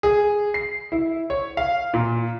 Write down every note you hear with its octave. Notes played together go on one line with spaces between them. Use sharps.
G#4
C7
E4
C#5
F5
A#2